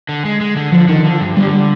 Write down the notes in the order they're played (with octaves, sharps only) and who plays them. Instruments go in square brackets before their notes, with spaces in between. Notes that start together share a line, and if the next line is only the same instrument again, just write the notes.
[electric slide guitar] D3
G#3
G#3
D3
[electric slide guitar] D3 [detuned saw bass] F3
[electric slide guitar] D3 [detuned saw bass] D#3
[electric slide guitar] D3 [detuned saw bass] F3
[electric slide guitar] G2
[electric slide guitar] D3 [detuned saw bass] G3
[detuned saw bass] G3